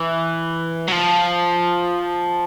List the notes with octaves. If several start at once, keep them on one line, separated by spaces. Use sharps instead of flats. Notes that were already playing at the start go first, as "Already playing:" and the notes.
Already playing: E3
F#3
F3